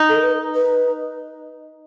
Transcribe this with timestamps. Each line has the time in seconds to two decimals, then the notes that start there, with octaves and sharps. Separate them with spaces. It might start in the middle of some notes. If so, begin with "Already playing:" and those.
Already playing: D#4
0.09 A4
0.16 A#4
0.23 B4
0.55 B4